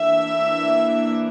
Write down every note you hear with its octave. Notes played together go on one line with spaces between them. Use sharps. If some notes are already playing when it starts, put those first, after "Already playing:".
Already playing: E3 A#3 D4 E5